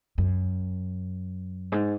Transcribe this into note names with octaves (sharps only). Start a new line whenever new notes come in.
F#2
G#2